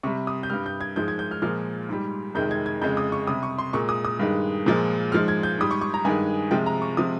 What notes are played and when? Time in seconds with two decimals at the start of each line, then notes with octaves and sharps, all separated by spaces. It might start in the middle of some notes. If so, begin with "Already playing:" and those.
0.03 C3 G3 C#6
0.27 D#6
0.43 G6
0.50 G2 G3 F6
0.66 G6
0.81 G#6
0.96 G#2 F3 G#3 G6
1.08 G#6
1.19 G6
1.31 F6
1.42 A#2 F3 G#3 F6
1.89 G#2 G3
2.35 F2 C3 D#3 G#3 G6
2.51 G#6
2.66 G#6
2.81 F2 C#3 G#3 G6
2.97 D#6
3.12 C#6
3.27 C3 G3 D#6
3.43 C#6
3.59 C6
3.73 A#2 G#3 C#6
3.89 D#6
4.05 D#6
4.19 G2 D#3 G#3
4.66 A#2 F3 G#3
5.12 G#2 F3 G#3 F6
5.28 G#6
5.43 G6
5.58 G#2 G3 D#6
5.71 C#6
5.81 C#6
5.94 A#5
6.05 G2 D#3 G#3 G#5
6.51 C3 F3 G#3 G5
6.66 A#5
6.82 C#6
6.97 C3 F3 G#3 D#6